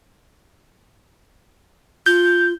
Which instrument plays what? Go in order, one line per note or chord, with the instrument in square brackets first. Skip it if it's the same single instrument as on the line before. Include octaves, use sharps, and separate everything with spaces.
[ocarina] F4 [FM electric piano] G6